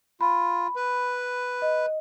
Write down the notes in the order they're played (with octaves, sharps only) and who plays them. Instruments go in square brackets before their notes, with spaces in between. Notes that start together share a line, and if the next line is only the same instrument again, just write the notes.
[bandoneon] F4 [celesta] B5
[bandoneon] B4
[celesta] D#5